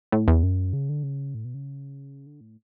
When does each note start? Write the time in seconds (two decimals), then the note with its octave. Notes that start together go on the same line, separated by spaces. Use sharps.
0.12 A2
0.28 E2
0.43 F#2
0.73 C#3
0.89 D3
1.03 C#3
1.34 A2
1.45 B2
1.54 C#3
2.26 D3
2.41 A2